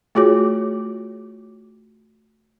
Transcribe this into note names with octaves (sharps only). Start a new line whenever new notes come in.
A3 F4 F#4 G#4 C#5 D6